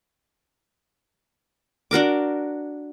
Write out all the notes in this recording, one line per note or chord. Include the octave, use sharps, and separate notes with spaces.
D4 F#4 A#4 D6